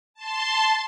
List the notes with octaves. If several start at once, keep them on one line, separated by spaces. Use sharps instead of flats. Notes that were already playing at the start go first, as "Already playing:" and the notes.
A5 C6